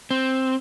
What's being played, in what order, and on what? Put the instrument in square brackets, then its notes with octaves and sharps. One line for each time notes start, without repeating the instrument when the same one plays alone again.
[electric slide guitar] C4